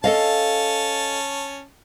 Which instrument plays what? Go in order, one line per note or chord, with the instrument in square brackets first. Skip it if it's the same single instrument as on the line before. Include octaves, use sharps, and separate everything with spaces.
[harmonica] C#4 A5 [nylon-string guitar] A4 D#5 F5